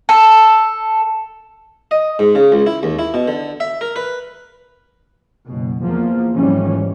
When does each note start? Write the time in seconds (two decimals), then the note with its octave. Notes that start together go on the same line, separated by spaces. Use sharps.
0.09 A4
1.91 D#5
2.19 G#2
2.35 C#3
2.52 C#2
2.66 E4
2.83 D#2
2.99 E4
3.14 B2
3.28 D3
3.60 E5
3.81 A#4
3.96 B4
5.46 F#1 B2
5.81 E2 F3 A#3
6.34 G#1 E3 F3 G3 C#4